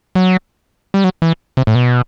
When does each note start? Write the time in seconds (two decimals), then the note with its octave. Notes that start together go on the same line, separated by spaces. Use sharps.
0.15 F#3
0.94 G3
1.04 F#3
1.22 E3
1.57 C3
1.67 A2
1.75 B2